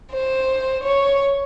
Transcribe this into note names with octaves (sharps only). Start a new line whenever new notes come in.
C5
C#5